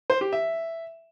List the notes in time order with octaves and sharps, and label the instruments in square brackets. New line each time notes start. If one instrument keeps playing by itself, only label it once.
[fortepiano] C5
G4
E5